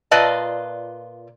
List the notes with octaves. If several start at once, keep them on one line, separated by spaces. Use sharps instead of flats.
A#2 F4 B4 D5 D#5 A5